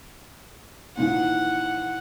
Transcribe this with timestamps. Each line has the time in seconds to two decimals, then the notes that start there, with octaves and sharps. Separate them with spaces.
0.97 A#2 D#3 E3 F#5